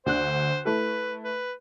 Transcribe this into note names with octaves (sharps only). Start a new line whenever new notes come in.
D2 D3 C5 F#6
A3 E4 A4 B4
B4